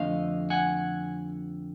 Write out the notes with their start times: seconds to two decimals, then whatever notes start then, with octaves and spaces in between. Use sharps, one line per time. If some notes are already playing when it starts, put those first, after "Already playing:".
Already playing: F2 D3 F3 A3 D#5 F5
0.50 F#5 G#5